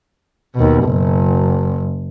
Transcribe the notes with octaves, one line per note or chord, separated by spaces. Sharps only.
D#2 B2
F#1